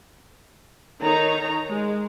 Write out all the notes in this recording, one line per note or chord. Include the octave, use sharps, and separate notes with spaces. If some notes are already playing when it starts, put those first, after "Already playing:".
D#3 D#4 A4 C#5 A#5
G#3